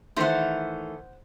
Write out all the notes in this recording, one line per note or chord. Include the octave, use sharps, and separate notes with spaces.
D#3 E3 A3 C5 F#5